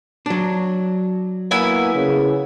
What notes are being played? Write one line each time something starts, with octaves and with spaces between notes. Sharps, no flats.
F#3 D4
A#3 B3 E4 G#5
C#3